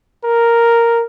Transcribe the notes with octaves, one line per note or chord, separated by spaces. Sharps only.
A#4